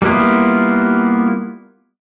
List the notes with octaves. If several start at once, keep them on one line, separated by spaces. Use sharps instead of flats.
G3 A#3 B3 E4 F4